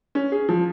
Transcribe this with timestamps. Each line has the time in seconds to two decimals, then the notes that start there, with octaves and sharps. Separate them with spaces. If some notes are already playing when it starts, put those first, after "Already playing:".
0.15 C#4
0.32 G#4
0.49 F3